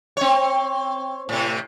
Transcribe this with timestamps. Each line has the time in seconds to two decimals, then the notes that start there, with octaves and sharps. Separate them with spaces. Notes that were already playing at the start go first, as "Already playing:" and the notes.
0.17 C4 C#5
1.29 A2 C3